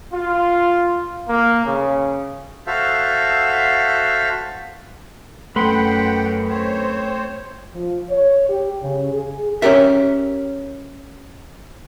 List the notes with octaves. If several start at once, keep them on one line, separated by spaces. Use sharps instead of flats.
F4
A#3
C#3
F#4 A4 C5 E5 F5
F#2 A3 B4 F#5 G5 B5 C6
C4 C5 C#5
F3
C#5
G4
C#3
G#4
C#4 G4 A#4 E5